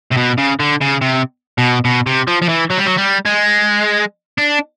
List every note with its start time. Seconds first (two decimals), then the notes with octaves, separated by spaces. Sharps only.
0.12 C3
0.18 B2
0.38 C#3
0.60 D3
0.81 C#3
1.01 C3
1.58 B2
1.85 B2
2.07 C3
2.28 F3
2.42 F3
2.49 E3
2.70 F#3
2.78 G3
2.86 F#3
2.97 G3
3.26 G#3
4.38 D4